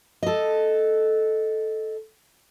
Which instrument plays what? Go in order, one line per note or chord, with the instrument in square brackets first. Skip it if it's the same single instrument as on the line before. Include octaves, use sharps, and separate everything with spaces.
[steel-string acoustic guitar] A4 D#5